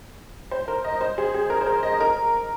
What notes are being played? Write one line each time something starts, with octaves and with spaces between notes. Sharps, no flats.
C5
A#4
D#5
C5
G#4
G#4
A#4
C5
A#4
D#5
A#4